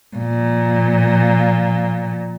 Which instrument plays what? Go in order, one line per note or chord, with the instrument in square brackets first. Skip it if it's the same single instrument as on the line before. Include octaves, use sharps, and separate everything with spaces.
[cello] A#2 F3